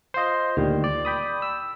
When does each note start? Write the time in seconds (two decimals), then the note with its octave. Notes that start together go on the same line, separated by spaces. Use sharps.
0.14 F4 C5 D#5 C6
0.57 D2 A#2 D#3 G3
0.84 D5
1.05 G5 B5 D#6
1.42 E6